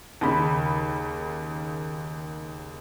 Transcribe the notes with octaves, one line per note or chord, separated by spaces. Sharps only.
D#2 C#3 B5